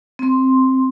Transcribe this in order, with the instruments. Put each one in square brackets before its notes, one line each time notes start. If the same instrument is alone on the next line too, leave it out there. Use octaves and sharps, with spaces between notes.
[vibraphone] C4 C6